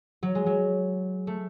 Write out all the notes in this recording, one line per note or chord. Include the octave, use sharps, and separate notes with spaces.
F#3
G#3
F#3
A3